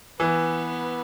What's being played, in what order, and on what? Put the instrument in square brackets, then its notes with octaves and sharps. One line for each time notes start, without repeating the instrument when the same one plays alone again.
[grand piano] E3 [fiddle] B3